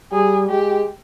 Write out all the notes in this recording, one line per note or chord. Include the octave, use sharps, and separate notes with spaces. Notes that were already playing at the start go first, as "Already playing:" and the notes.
G3 G#4
G#3 G4